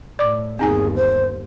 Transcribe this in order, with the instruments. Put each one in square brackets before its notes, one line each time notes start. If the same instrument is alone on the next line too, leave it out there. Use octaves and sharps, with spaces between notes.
[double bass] A2 [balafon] D5 D6
[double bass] G1 D#2 [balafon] C4 D#4 G#5 [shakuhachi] G#4
[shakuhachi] C5